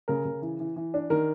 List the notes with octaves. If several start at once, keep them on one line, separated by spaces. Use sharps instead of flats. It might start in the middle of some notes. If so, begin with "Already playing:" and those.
C#3 A#4
C#3
E3
E3
E3
D4
D#3 A#4